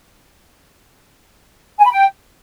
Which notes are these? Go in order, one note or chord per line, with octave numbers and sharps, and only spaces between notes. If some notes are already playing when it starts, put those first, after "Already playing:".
G#5
B5
G5